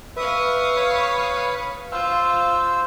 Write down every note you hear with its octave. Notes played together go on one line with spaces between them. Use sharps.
B4 E5 F5 C#6 D#6
C#5 B5
F4 C5 F5 E6